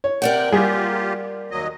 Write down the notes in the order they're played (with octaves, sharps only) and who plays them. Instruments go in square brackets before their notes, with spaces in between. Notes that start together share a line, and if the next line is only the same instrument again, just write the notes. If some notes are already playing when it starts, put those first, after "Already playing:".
[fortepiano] C#5
[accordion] C3 G5 [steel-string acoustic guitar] A#4 D5 F#5
[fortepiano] G3 G#4 [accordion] A#3 F4 G4
[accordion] D#2 F#3 D#5